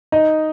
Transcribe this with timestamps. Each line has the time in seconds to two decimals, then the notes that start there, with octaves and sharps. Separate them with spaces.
0.12 D#4 D#5